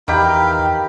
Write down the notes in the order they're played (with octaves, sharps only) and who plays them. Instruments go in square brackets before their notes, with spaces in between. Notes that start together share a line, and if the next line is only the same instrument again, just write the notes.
[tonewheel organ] E2 [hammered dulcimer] D#3 G4 B4 [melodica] D#4 E4 F5 [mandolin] G5